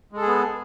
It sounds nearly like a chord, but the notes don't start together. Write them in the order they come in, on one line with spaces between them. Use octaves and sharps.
G#3 A4 G#4 B3